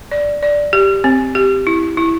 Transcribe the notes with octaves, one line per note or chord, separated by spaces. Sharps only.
D5
D5
G4
C4
G4
E4
E4